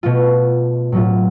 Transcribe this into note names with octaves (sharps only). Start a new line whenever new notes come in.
B2 A3 F4
A2 F#3 C#4 F4